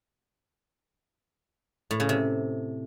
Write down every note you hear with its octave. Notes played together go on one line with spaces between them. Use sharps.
A2
C#3
C3